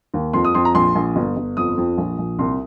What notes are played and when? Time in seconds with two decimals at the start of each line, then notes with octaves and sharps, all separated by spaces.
0.14 D#2
0.33 F2 C6
0.45 D#6
0.54 F2 C6
0.65 A#5
0.75 A#1 C6
0.95 A#1
1.16 G1
1.37 G1
1.57 F2 D#6
1.77 F2
1.98 A#1
2.18 A#1
2.39 C2 C6